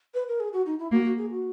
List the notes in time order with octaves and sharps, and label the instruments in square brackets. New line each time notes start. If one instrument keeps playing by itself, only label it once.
[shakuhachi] B4
A#4
G#4
F#4
D#4
E4
[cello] A#3 [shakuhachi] F#4
[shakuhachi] F#4
G#4
F#4